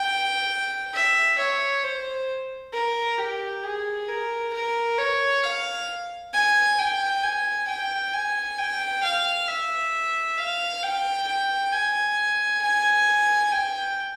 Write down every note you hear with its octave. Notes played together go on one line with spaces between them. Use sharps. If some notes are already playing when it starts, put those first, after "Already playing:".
Already playing: G5
E5
C#5
C5
A#4
G4
G#4
A#4
A#4
C#5
F5
G#5
G5
G#5
G5
G#5
G5
F5
E5
F5
G5
G5
G#5
G#5
G5